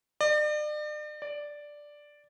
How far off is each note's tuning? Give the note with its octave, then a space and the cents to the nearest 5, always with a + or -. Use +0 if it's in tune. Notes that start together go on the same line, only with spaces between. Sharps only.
D5 +40
D5 +0